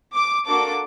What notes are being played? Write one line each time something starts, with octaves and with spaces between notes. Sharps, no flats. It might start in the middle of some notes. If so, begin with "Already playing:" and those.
D6
A#3 D4 F#4 A4 D6